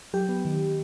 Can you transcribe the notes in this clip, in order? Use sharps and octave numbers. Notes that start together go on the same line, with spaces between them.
F#3 G4
B3
D#3